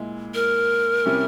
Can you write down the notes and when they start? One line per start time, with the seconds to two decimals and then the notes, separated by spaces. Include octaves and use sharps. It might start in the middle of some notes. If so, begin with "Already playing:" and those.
Already playing: A#2 G#3 E4
0.34 A#4
1.06 C3 G3 C#4 E4